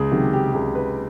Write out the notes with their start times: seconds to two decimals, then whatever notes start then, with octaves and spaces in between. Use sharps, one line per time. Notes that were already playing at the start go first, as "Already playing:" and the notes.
Already playing: C#2 G#4
0.11 C3 D#3 F#3 G4
0.33 G4
0.54 C#2 G#4
0.75 B4